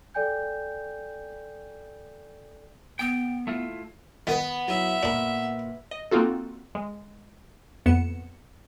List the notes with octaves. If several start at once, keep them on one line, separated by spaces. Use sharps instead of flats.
A4 D5 G5 G#5 G6
B3 G5
A3 E4 F4
D#3 B3
F#3 E4 E5
A#2 D4 A#4 B5
D#5
A#3 C4 D#4 F4 F#4 A4
G#3
A#1 F2 B3 C#7 E7